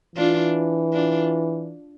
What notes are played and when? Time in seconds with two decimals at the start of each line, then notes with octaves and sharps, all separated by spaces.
0.16 E3 D4 F4
0.93 D4 F4